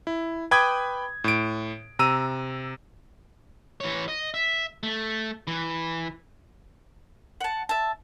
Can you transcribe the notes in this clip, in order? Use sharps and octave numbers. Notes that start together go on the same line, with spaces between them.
E4
B4 G5 B5 D6 D#6 G#6
A2 D7
C3 A#5 E6 D#7
E3 C#5
D#5
E5
A3
E3
F#5 A5
E5 A5